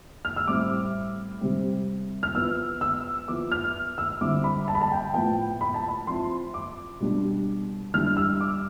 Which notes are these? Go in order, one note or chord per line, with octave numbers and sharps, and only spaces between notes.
F6
E6
A2 G3 C4 E4 D6
C3 G3 C4
F6
F3 B3 E4 E6
E6
F3 B3 E4 D6
F6
E6
D3 G3 C4 E4 D6
B5
A5
B5
A5
G5
A2 F3 B3 G5
B5
A5
B5
F3 C4 E4 C6
D6
B2 G3 D4
E3 G3 D4 F6
E6
D6